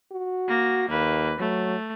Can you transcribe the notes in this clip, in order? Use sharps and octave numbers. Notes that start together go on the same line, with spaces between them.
F#4
A#3 A#6
D#2 A#3 B4
F#3 A3